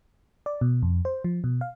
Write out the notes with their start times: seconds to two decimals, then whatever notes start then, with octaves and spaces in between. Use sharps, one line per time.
0.46 D5
0.61 B2
0.83 F2
1.05 C5
1.24 F3
1.44 B2
1.61 F5